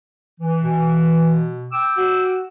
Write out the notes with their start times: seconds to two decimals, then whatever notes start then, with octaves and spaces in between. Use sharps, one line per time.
0.40 E3
0.61 B2
1.72 G5 D6 E6
1.97 F#4